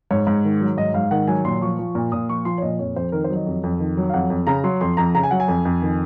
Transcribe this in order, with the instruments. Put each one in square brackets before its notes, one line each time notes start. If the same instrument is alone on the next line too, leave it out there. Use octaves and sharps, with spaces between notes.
[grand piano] G#2 C#5
G#2
D#3
F#3
G#2 D#5
G#2 F5
D#3 F#5
F#3 G#5
A#2 C6
F3 C#6
F3
A#2
A#2 D#6
F3 C#6
F3 C6
C#5
A#2 D#5
F2 C#5
F2 C5
D#3 A#4
C5
F#3
D#5
F2
F2
D#3
F#3
F5
F2 F#5
F2
C#3 A#5
F#3 C6
F2 C6
F2 A#5
C#3 A#5
G#5
F#3 F#5
G#5
F2
F2
D#3